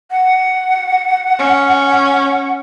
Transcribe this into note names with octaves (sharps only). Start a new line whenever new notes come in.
F#5
C#4